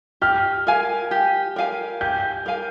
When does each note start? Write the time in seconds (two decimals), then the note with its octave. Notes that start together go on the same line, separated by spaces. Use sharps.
0.21 G4 F6
0.67 A#4 F5 G#5
1.11 G4
1.56 A#4 F5 G#5
2.01 G4 G6
2.46 A#4 F5 G#5